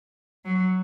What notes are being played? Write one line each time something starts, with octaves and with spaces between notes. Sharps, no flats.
F#3